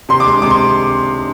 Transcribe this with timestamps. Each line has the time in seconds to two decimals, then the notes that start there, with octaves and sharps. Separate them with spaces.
0.09 C3 C6
0.20 D6
0.26 G#3
0.42 C3 D6
0.50 C6